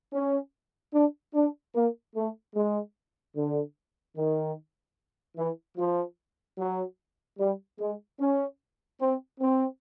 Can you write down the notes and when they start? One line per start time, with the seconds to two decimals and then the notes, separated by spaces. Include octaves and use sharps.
0.12 C#4
0.93 D4
1.34 D4
1.74 A#3
2.15 A3
2.54 G#3
3.35 D3
4.16 D#3
5.37 E3
5.77 F3
6.58 F#3
7.39 G3
7.79 G#3
8.19 C#4
9.00 C4
9.40 C4